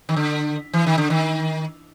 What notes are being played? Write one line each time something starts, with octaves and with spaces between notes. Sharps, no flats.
D#3
D3
E3
D#3
D3
D#3